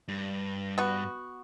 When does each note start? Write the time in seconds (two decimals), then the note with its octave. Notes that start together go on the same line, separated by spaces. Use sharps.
0.08 G2
0.78 B3 F#4